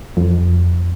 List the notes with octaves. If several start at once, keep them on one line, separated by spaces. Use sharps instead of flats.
F2